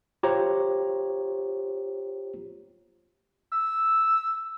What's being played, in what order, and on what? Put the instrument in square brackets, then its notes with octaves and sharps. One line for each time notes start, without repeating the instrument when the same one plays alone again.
[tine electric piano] F4 G4 C5 C#5 A#5
[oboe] E6